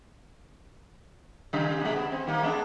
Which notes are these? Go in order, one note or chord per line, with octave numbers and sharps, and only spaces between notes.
C#3 G3
A#2 G#3
B3
C4
D#3 G3 A#3
G#3 B3 D4